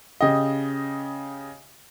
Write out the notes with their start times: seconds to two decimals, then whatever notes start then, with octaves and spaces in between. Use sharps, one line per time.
0.21 C#3 G4 D#5